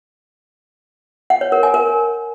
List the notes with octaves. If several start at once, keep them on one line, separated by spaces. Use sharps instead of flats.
F#5
C#5
A#4
G#5
A#4